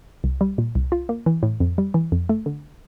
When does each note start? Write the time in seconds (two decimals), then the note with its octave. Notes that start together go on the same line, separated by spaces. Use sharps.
0.24 C2
0.41 G3
0.58 A#2
0.75 C2
0.92 F4
1.09 A#3
1.26 E3
1.43 A2
1.60 F2
1.78 G3
1.94 E3
2.12 F2
2.29 A3
2.46 D3